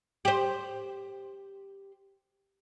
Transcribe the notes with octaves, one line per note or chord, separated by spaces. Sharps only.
G4 C5